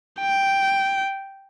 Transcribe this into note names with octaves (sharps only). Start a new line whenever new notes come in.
G5